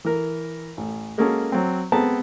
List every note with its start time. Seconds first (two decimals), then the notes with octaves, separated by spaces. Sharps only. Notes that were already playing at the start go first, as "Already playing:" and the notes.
0.05 E3 A#4
0.77 A1
1.18 G#3 A#3 C#4 F#4 G#4 A4
1.52 F#3 C4
1.92 G#3 B3 C4 A5 A#5